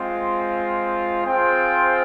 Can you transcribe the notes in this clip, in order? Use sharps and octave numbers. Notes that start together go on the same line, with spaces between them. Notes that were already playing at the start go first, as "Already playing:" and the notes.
Already playing: G#3 C4 F4
C4 F4 G#4 C5 G5